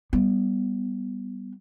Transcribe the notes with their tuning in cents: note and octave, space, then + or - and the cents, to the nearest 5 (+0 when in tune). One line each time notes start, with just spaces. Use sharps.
G3 +0 B3 +0